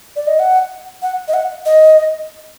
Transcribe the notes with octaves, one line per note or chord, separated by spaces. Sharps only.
D5
D#5
F#5
F#5
D#5
F#5
D#5